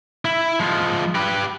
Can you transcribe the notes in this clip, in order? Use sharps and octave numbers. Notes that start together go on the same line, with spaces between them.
E4
F3 G#3
G4 B4